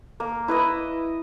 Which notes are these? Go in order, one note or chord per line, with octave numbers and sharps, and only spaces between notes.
A#3
E4 B4 D#5